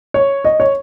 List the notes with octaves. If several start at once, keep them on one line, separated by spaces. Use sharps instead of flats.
C#5
D#5
C#5